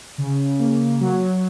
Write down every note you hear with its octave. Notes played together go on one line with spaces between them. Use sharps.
C#3
A#3
F#3